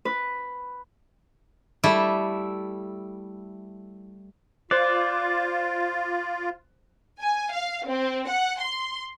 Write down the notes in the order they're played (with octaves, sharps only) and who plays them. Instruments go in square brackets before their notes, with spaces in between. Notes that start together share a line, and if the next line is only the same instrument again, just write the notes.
[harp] B4
[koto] G3 A3 E4
[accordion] F4 [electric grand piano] C5 F#6 [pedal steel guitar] D5
[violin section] G#5
F5
C4
F#5
C6